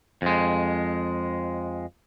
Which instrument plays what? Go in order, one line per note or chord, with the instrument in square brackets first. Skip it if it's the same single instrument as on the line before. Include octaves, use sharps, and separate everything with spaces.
[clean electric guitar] F2 G#3